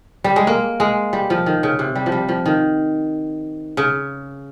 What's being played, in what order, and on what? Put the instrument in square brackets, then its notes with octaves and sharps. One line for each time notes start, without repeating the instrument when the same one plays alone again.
[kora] G3
G#3
A#3
G#3
G3
F3
D#3
C#3
C3
G3
F3
G3
F3
D#3
C#3